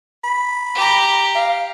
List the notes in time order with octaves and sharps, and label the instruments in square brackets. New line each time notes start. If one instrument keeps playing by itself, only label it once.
[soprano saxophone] B5
[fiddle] G4 A#5
[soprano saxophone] F5